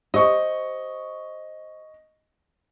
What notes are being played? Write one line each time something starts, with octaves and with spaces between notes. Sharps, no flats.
G4 C5 D#5 C#6